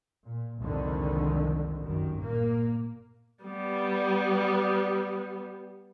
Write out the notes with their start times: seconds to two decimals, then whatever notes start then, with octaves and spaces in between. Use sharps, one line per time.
0.24 A#2
0.58 C2 F2 G#2 D3 D#3
1.83 G1 F#2 D#3
2.19 A#2 A#3
3.43 G3 B3